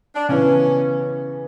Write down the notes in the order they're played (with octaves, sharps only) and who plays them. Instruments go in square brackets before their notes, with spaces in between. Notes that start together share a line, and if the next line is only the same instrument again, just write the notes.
[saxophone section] D4
[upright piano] C#3 E3 B3 [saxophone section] C#4